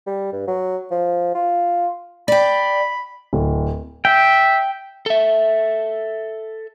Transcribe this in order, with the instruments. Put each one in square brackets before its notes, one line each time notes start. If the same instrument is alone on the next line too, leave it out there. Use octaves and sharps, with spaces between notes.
[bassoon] G3
G2
F#3
F3
F4
[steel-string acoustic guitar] D5 G5 [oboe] B5
[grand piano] D1
[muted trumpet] E5 [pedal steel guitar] G5
[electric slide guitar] A4 E5